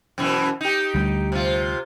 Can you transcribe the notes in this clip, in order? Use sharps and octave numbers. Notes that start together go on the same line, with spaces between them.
F#2 B2 E3
D#4 G4
D2 G3
C3 F4